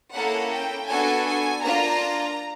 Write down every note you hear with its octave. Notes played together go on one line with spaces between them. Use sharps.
A#3 C#4 E4 A4 F#5
G5
B3 D4 F#4 A4 G#5
G#5
A#3 D4 F4 A#5